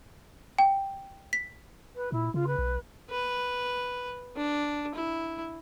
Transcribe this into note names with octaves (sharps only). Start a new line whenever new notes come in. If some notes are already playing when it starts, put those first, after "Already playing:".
G5
B6
B4
A#2 E4
C#3 F4
B4
B1
B4
D4
E4